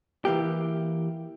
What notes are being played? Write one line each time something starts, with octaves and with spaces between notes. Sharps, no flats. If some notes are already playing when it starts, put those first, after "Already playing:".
E3 A#3 G4